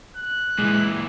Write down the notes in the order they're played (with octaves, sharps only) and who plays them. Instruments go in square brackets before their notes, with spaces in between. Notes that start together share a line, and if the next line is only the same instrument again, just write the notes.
[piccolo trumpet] F#6
[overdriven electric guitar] A#2 E3 [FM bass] G#3